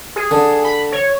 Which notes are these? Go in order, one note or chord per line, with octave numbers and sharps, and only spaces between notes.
G#4
D3
B5
C#5